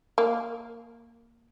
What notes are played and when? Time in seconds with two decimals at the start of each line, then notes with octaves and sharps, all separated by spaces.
0.18 A#3